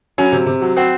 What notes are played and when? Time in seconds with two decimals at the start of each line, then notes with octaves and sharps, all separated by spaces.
0.18 F#3 C#4
0.32 C3
0.46 C3
0.61 F#3
0.76 C4 F#4